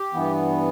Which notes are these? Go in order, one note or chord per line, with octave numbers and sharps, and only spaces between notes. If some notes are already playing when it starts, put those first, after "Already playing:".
Already playing: G4
G2 E3 B3